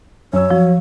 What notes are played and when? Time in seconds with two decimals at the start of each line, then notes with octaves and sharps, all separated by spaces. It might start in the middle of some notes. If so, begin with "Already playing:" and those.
0.33 F#2 C#5 E6
0.51 F3 F#3